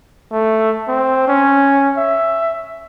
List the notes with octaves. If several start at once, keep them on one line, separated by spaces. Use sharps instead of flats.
A3
C4
C#4
E5